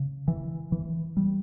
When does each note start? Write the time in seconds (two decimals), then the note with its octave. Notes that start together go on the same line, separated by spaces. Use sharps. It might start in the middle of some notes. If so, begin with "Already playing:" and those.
Already playing: C#3
0.28 E3
0.72 E3
1.17 G3